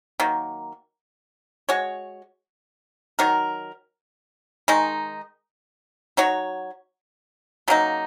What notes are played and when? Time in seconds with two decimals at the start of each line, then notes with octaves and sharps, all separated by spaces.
0.20 D#3 F#3 A#3
1.69 G#3 F#4 C#5
3.19 D#3 F#3 D#4 A#4
4.68 D#3 G#3 D#4
6.17 F#3 D#4 F#4 C#5
7.68 C#3 F#3 A#3 D#4